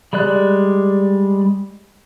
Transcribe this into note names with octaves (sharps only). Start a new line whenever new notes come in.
G3 G#3 D5 F#6